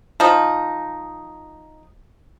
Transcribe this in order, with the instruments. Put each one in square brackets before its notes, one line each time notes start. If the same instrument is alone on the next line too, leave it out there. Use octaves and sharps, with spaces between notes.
[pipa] F3 D#4